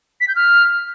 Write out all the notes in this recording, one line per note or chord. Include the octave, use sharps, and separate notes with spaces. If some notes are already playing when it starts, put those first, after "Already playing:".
B6
G6
F6